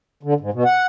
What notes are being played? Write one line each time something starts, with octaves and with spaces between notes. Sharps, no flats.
D3
G#2
B2
F#5